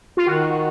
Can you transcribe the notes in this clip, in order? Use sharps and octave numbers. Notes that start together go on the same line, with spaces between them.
F4
D#3 F#4